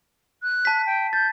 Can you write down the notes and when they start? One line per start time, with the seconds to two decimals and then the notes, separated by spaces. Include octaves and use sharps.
0.43 F#6
0.65 A5 B6
0.86 G5
1.13 G6 A6